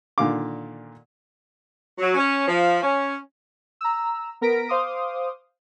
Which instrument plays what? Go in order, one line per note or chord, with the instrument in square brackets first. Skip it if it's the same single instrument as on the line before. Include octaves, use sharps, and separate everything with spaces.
[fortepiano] A#2 D3 D#3 F5 D6
[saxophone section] F#3
C#4
F3
C#4
[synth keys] A#5 E6
B3 A#4 A#6 B6 D7
C5 F5 C6 D6 D#6